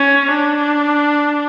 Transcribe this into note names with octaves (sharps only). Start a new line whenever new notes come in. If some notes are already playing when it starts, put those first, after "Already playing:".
Already playing: C#4
D4